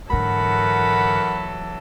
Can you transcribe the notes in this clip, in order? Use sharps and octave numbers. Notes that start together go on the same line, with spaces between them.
G#2 D3 E3 F#3 A4 A#4 F#5 B5